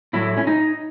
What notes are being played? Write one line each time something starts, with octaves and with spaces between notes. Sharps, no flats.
A2 F#3 A3 E4
C#4
D#4